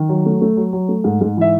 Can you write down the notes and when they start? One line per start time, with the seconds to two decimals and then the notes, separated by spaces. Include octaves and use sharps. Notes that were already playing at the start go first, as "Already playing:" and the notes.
Already playing: D#3
0.09 F#3
0.26 A3
0.41 A3
0.57 F#3
0.73 F#3
0.89 A3
1.04 G#2
1.21 G#2
1.37 E3 E5